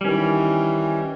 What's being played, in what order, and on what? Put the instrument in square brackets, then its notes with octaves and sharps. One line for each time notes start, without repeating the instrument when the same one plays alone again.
[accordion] D#3 E3 [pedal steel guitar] G3 C#4